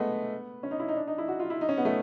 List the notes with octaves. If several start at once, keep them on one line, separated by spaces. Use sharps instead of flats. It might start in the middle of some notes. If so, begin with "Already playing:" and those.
Already playing: G#3 A3 B3
C#4
D#4
E4
D#4
D4
D#4
E4
F#4
F4
E4
D#4
C#4
B3
A3